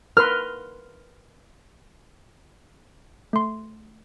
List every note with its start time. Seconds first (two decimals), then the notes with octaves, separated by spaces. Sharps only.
0.17 A#4 B4 C6 F6
3.33 A3 C6